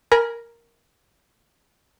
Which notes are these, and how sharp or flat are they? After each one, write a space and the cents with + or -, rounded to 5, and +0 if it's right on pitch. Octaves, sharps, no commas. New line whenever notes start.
A#4 +0 G#5 +0 B5 -30